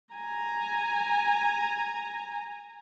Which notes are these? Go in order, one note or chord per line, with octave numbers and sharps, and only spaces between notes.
G#5 A#5